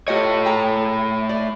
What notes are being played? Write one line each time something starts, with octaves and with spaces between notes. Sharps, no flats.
A3 F4 G4 C#5 D#5
G#4 G5 A#5
D5